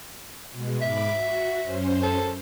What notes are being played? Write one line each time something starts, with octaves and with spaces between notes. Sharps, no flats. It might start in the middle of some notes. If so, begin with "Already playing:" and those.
B2 G#3
G#2 E5 B5 D6
F#4
F#2 C#4 C5
A4